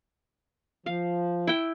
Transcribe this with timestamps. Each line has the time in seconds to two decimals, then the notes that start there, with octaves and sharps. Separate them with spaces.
0.86 F3 F5
1.47 E4 G5